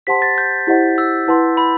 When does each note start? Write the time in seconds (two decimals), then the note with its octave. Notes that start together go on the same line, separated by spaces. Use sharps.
0.07 G4 C5 F#5 A5 C6 B6
0.22 A6
0.38 G6
0.67 E4 G4 C5 D#5 F#5
0.98 E6
1.27 E4 B4 F#5 A5 C6
1.57 B5